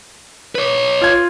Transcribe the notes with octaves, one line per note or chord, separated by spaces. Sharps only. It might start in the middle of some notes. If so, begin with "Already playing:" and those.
B4 C#5
F4 G#6